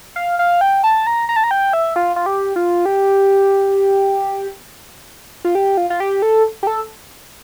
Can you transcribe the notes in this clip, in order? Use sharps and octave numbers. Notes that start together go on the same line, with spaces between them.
F5
F5
G5
A5
A#5
A#5
A5
A#5
G5
E5
F4
F4
G4
F4
G4
F4
G4
F4
F4
G4
A4
G4
A4